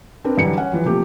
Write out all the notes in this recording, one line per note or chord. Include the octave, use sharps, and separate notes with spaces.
C4 D4 A#4 B4
F#2 D3 E3 G3 C#7
C#4 F#5
E3 F3 G3
C3 F3 A3 A#3 G4